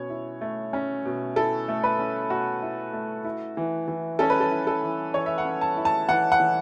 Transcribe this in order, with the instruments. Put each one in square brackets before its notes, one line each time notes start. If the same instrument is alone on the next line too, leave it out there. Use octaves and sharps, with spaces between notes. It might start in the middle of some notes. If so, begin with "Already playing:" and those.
Already playing: [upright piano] B2 C#4 C#5
E4
A3
C#4
B2
E4 A4
A3
B4
C#4
B2 F#4
E4
A3
E4
E3
E3
C#4 A4
B4
A4
E4
A4
E3
E3 C#5
E5
F#5
C#4
A5
E4
A5
E3 F#5
F#5
E3